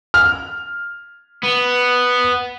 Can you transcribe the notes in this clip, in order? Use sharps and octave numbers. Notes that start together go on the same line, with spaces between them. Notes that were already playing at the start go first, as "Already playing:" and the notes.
F6
B3